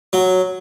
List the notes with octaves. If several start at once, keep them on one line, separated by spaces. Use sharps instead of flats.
F#3